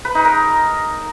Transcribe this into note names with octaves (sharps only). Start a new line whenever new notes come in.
B4
D#4
A#4